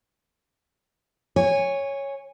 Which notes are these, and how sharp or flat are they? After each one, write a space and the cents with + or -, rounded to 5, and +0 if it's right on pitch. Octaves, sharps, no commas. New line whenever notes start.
C#5 +0 G#5 -20